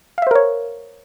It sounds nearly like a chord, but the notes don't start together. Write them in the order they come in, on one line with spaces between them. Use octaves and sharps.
F5 E5 C5 A#4 C#5